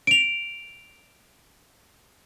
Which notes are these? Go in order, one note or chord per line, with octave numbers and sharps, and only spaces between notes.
D7 F7